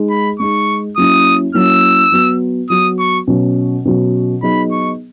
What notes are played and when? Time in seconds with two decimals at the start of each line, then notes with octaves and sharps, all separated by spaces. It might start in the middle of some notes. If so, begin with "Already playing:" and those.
Already playing: G#3 D#4 G#4
0.10 B5
0.40 G#3 D#4 G#4 C#6
0.97 F#3 A#3 C#4 E4 D#6
1.54 F#3 A#3 C#4 E4 E6
2.12 F#3 B3 F#4
2.70 F#3 B3 F#4 D#6
2.99 C#6
3.27 B2 F#3 C#4 F#4
3.85 B2 F#3 C#4 F#4
4.43 F#3 B3 D#4 G#4 B5
4.72 C#6